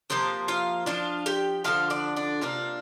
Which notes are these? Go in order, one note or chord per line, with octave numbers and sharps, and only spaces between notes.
C3 F3 A#3 C5
F4 F5
F3 D4 F4 F5
G4 G5
D3 F3 D4 F4 F5
D4 D5
D4 D5
C3 A#3 D4 F4 F5